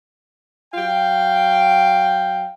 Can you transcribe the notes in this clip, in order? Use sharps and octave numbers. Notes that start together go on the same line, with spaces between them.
F#3 F5 G5